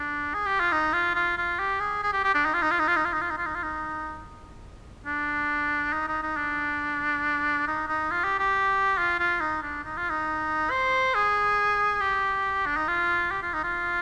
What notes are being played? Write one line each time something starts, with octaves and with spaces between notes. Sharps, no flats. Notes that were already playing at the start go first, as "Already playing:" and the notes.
Already playing: D4
G#4
G4
F4
D#4
F4
F4
F4
G4
G#4
G#4
G4
G4
D4
D#4
F4
D#4
F4
D#4
F4
D#4
F4
D#4
F4
D#4
F4
D#4
F4
D#4
D4
D#4
D#4
D#4
D4
D#4
D#4
F4
G4
G4
F4
F4
D#4
D4
D#4
F4
D#4
C5
G#4
G4
D4
D#4
F4
G4
F4
D#4
F4